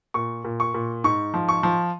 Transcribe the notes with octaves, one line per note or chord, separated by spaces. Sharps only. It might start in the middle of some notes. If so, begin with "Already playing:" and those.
A#2 C#6
A#2
C#6
A#2
G#2 C#6
F3
C#6
F3